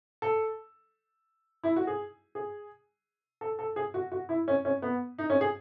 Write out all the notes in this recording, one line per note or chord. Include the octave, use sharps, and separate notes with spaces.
A4
E4
F#4
G#4
G#4
A4
A4
G#4
F#4
F#4
E4
C#4
C#4
B3
D#4
C#4
G#4